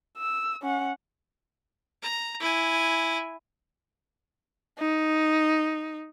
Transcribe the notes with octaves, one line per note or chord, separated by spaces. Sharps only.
E6
C#4 F#5
A#5
E4 G#5
D#4